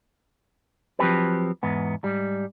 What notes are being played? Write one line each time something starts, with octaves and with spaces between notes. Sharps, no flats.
F3 F#3 C4 G4 B4
E2 G#2 B3
G#2 G3